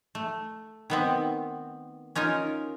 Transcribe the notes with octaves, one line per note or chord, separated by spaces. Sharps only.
A3
D#3 B3 C4
C#4 D#4 F4 A#4